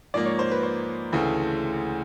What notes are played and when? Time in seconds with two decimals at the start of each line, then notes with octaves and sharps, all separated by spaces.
0.14 G#2 F3 A#3 D5
0.25 C#5
0.39 C5
0.51 B4
0.63 C5
1.13 D2 C#3 E3 A3